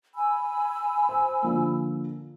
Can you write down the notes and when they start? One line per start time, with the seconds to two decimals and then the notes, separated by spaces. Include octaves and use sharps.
0.14 G#5 B5 E6
1.09 C5
1.42 D3 F3 A#3